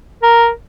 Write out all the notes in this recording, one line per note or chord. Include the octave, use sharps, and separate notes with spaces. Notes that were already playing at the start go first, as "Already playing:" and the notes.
A#4